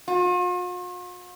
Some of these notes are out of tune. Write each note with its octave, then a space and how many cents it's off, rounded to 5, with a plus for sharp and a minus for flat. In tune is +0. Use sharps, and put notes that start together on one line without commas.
F4 +45